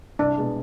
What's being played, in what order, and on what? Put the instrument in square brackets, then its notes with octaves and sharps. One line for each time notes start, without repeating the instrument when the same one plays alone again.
[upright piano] C2 [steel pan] D4
[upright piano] B2 G#3